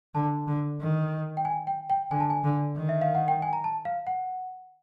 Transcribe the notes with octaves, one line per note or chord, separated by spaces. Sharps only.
D3 A5
D3
D#3
G5
G#5
G5
G5
D3 G#5
A5
G#5
D3
D#3
E5
F5
F#5
G5
G#5
A#5
A5
F5
F#5